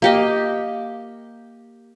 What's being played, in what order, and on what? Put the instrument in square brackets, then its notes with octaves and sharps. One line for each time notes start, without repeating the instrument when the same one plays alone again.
[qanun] A#3 G4 D#5